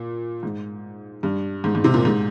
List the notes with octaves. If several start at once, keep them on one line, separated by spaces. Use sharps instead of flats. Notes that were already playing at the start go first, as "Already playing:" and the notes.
Already playing: A#2
G#2
G2
G#2
G#2
C3
A#2
G#2